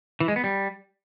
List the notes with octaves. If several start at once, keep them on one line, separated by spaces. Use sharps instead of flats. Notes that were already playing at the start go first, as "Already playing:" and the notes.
E3
G#3
B3
G3